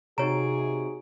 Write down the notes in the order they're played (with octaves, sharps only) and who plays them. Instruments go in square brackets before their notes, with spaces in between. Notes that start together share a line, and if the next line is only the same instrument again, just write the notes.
[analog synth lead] C3 [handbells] D#4 F#4 D7 [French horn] G#4 [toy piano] C#5 A#5